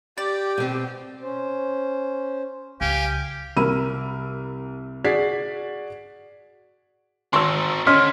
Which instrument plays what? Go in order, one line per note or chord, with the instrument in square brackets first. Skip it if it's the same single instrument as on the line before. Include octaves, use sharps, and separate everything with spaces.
[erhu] G4 [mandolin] D5
[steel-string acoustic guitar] B2 C4
[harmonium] C#4 C5
[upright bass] C#2 [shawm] G4 [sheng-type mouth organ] F5 G#5
[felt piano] C2 A#4 B5 E6 D#7
F#4 G#4 D5 G#6 B6 C7
[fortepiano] G#1 C6 [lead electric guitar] C4 D#4 [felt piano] C#6 E6
[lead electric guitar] D3 [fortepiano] C#4 [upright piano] D#5 C6 F6 [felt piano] B6